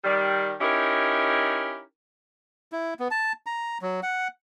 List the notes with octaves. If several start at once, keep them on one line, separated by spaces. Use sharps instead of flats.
D#3 G3
C#4 D#4 E4 G4 A#4
E4
B3
A5
A#5
F#3
F#5